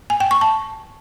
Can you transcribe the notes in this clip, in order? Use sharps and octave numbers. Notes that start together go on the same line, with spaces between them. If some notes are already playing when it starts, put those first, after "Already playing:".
G#5
G5
C#6
A5